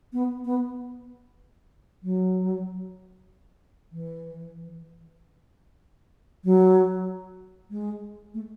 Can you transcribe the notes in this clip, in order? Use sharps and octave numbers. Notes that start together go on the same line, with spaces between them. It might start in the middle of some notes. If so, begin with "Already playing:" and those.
B3
B3
F#3
E3
F#3
G#3
A3